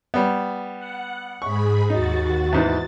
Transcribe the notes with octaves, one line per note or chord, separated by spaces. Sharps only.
G3 B3
F#5
G#2 G#4 B5 C#6
D#2 D#4 F#4 A6
E2 G#2 E3 A6